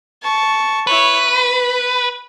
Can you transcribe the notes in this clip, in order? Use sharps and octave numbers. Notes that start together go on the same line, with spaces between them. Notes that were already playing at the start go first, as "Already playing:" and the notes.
A5 C#6
E4 B4 C#5
B5